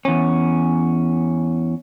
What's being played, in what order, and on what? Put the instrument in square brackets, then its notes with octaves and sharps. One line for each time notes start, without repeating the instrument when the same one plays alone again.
[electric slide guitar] E2 C#4